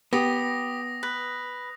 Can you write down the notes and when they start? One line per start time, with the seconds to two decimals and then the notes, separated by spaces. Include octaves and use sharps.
0.13 B3 G4 D#6 A#6
1.03 B4